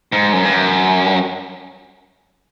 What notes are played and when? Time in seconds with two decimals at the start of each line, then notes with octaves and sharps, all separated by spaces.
0.12 G#2
0.33 F#2
0.45 G2
0.53 F#2